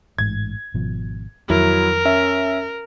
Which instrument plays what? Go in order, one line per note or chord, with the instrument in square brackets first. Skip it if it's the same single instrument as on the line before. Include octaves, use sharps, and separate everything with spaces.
[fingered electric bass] A1 G#2 [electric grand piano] G#6
[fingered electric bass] G#1 B2 F3
[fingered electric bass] F2 D#3 [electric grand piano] F#3 E4 [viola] A#4
[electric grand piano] C#4 E5